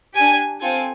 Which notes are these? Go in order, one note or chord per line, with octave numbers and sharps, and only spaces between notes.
D4 G4 G#5
C4 F4 A4 G#5